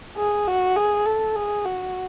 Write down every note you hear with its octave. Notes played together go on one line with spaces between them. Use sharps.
G#4
F#4
G#4
A4
G#4
F#4